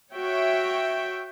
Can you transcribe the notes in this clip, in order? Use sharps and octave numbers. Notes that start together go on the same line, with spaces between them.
F#4 C#5 E5 G5